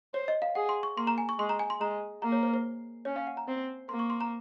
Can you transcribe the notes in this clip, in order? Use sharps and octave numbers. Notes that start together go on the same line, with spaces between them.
C5 C#5
D#5
F5
G#4 F#5
C6
C#6
A#3 C6
A#5
G#5
C#6
G#3 C6
A#5
G#5
C6
G#3 A#5
A#3 A#5
C#5
C5
C5
C#4 C#5
F5
F#5
A#5
C4
A#3 C6
C#6
C6
A#5